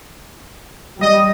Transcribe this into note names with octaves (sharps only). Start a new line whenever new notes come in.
G3 D#5